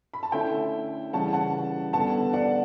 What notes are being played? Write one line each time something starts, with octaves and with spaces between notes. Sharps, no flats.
B5
A5
D3 A3 C#4 E4 E5 G5
C#3 E3 G3 C#4 F#5 A5
F#5 A5
D3 G3 B3 F#5 A5
D5 F#5